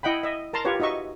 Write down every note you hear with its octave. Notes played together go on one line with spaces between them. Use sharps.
E4 D#5 F#5 G5 B5
D#5 E5
A#4 A5 A#5 C6
F4 G4 B4 C#5
D#4 F#4 D#5 E5 C#6